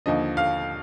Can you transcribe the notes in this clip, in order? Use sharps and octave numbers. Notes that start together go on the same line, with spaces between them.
D#2 D3 F3 D#5
F5